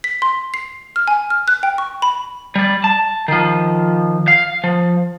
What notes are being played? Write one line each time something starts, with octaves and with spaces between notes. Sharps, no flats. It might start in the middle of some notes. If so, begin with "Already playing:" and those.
B6
C6
C7
F6
G#5
F6
F#6
G5
C#6
B5
G3 D5
A5
D#3 F3
F5
F3